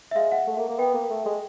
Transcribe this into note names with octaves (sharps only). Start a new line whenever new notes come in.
E5
G#3 F5
F#5
A3
A#3
A#3
B3 G5
A#3
A3
G#3